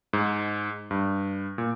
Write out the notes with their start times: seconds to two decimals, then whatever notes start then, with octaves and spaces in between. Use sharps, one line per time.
0.13 G#2
0.91 G2
1.58 A#2